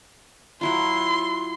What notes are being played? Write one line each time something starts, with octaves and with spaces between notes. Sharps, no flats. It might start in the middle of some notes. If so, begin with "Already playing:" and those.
F#3 E4 F4 C6